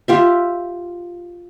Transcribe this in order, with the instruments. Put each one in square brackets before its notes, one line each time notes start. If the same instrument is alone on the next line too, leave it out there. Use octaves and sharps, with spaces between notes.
[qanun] F4 G4 E5